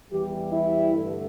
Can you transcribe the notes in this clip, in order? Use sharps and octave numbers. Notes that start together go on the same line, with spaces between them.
E2 E3 G3 G4
E4
G2 D3 A3